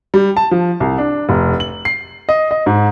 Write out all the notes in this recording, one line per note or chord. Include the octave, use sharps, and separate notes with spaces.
G3
A5
F3
C2
D4
F1
F#7
C7
D#5
D#5
G#2